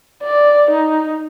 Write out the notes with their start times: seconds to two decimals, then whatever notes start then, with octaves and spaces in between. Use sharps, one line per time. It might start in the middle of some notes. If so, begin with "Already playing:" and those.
0.23 D5
0.71 D#4